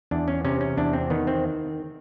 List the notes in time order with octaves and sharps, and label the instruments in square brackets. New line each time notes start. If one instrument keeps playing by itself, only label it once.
[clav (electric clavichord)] E2 D4
C#4
C3 C#4
C#4
E2 D4
C4
D#3 B3
C4